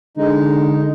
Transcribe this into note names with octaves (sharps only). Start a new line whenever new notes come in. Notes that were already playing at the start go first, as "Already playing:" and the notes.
D3 G#3 D#4